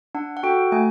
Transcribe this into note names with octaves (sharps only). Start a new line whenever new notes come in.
D4 F#5
F#5
F#4 A4 G5
A3 G#5